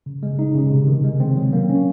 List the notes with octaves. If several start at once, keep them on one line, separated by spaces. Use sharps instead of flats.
C#3
G#3
D#4
C#3
C3
D#3
G#3
C4
F#3
A#3
C#4